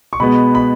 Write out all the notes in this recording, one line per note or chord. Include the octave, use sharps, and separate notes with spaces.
C#6
B2 G#3 B3 B5
B5